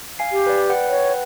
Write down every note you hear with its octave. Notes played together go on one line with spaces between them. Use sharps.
F5 G#5 C7
G4
B4 D5
B4 F#5 G5
C#5